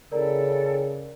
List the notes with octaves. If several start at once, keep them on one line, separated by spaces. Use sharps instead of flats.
C#3 E4 A4 A#4 D5 G5 A#5